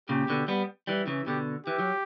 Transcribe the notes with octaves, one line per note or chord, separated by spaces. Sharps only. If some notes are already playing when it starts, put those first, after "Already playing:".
A#2 C#3 G4
B2 D3
G3 B3
E3 G3
C#3 E3
B2 D3 G4
E3 G4
F#3